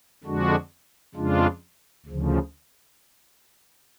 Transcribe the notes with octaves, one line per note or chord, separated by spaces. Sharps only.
F2 D3 G#3 D4 F#4
F2 C#3 G#3 D4 F4
D2 C#3 F3